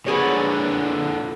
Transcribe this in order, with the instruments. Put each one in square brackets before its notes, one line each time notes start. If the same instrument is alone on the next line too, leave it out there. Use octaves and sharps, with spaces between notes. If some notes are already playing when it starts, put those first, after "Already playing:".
[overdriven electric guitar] A#2 D3 [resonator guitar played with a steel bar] B3 G#4 C#5